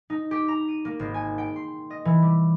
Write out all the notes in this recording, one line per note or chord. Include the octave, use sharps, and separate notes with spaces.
D#4
G4
A#5
D#7
A#3
G#1
G#5
G5
C6
D#5
E3
G3